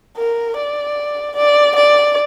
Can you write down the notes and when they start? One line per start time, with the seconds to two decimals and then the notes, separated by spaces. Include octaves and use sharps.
0.17 A#4
0.57 D5
1.36 D5
1.76 D5